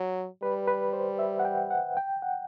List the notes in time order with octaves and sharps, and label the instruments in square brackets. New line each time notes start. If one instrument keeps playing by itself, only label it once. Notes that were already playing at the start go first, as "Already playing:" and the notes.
Already playing: [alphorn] F#3
[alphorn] G3 [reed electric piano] B4
[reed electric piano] B4
C5
E5
F#5
G5
F#5
G5
F#5